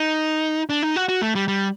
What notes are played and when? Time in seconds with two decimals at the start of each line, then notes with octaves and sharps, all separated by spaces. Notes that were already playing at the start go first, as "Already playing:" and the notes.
Already playing: D#4
0.69 D4
0.82 D#4
0.96 F#4
1.09 F#4
1.22 A3
1.35 G3
1.48 G3